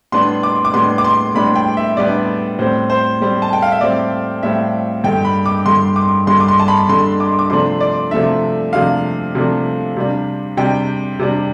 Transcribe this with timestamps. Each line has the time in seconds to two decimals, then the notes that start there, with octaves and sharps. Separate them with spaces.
0.12 A2 G3 B3 D4 C6
0.43 D6
0.65 D6
0.73 A2 G3 B3 D4 C6
0.98 D6
1.04 C6
1.35 A2 G3 B3 D4 B5
1.56 G5
1.77 E5
1.97 A2 G3 B3 D4 D5
2.59 A2 G3 C4 C5
2.90 C5
3.20 A2 G3 C4
3.42 A5
3.53 G5
3.62 F5
3.72 E5
3.81 A2 G3 C4 D5
4.43 A2 G3 C4 E5
5.04 G2 D3 G3 G5
5.25 B5
5.46 D6
5.66 G2 D3 G3 C6
5.96 D6
6.27 G2 D3 G3 C6
6.40 D6
6.48 C6
6.60 A5
6.68 B5
6.89 G2 D3 G3 C6
7.20 D6
7.39 D6
7.50 C3 F3 A3 D4 C6
7.80 D5
8.11 C3 F3 A3 D4 E5
8.73 C3 F3 A3 D4 F5
9.35 C3 F3 A3 D4
9.97 C3 G3 D4
10.57 C3 G3 D4 G5
11.19 C3 G3 D4